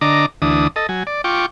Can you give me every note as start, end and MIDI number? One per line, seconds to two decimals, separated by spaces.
0.01 0.26 50
0.01 0.26 62
0.01 0.26 75
0.01 0.26 82
0.01 0.26 86
0.42 0.68 38
0.42 0.68 52
0.42 0.68 62
0.42 0.68 87
0.76 0.87 69
0.76 0.87 75
0.89 1.03 54
0.89 1.03 80
1.07 1.21 74
1.24 1.46 65
1.24 1.46 79
1.24 1.46 85
1.24 1.46 86